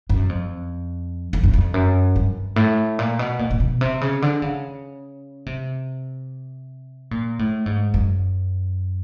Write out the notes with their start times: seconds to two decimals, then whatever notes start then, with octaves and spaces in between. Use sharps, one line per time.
0.09 F#2
0.29 F2
1.33 F2
1.43 F#2
1.54 F2
1.74 F#2
2.16 G2
2.56 A2
2.99 A#2
3.19 B2
3.39 A#2
3.51 A#2
3.60 B2
3.81 C3
4.01 C#3
4.22 D3
4.42 C#3
5.46 C3
7.11 A#2
7.39 A2
7.66 G#2
7.94 F#2